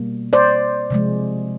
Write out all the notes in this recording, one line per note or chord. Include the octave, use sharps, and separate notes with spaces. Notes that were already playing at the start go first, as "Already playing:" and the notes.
Already playing: B2 G3 A#3
C5 D5
C3 F3 G#3